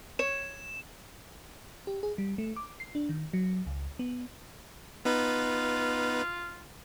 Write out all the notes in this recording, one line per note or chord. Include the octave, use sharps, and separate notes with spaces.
C#5 E7
G4
G#4
G3
A3
D6
C7
D4
D#3
F#3
C#2
B3
B3 D#4 F4 B4